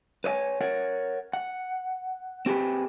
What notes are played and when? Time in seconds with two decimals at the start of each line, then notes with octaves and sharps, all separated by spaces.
0.24 B4 C#5 D#5 G#5
0.61 A#4 C#5 F#5
1.33 F#5
2.46 C4 G4 G#4 B4